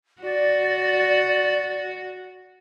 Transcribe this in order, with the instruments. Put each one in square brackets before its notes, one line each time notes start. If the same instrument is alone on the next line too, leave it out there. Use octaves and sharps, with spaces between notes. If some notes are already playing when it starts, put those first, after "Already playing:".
[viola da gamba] F#4 [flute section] D5